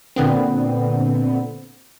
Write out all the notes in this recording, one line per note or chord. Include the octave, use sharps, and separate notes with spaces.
A#2 D3 B3 C4